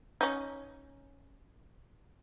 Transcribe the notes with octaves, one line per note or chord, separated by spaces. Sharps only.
C#4 D#4